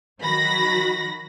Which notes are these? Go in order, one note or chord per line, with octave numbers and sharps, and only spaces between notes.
D#3 F#3 F#4 B5 A#6